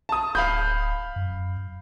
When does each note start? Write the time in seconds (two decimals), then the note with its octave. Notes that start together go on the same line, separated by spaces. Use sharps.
0.09 A5 D#6
0.35 D1 F5 B5 G6
1.16 F#2